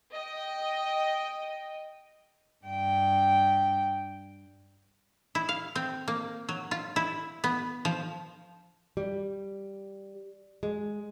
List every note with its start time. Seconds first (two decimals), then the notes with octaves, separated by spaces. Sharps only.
0.14 D#5 G5
2.65 G2 G5
5.35 E4
5.49 F5
5.75 C4
6.08 A#3
6.49 F#3
6.71 F4
6.96 E4
7.44 B3
7.85 F3
8.97 G3
10.63 G#3